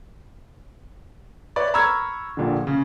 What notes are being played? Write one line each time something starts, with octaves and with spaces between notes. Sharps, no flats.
B4 C#5 D5 E5
A#5 B5 C#6 E6 F6 G#6
A#1 A#2 D3
C#3